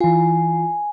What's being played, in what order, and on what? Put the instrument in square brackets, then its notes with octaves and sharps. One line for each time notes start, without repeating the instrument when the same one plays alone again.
[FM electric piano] E3 F4 [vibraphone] G#5